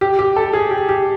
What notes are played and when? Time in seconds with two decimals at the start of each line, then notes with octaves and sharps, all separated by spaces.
0.01 G4
0.19 G4
0.36 A4
0.53 G#4
0.71 G4
0.89 G4